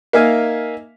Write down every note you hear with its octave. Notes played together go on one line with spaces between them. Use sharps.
A#3 D#4 E5 F5 G#5